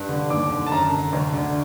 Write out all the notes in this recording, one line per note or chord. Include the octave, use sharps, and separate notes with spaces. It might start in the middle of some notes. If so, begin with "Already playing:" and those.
Already playing: G2
D3
D#2 D6
D3
A5
F#2 A#5
D3
D2
D3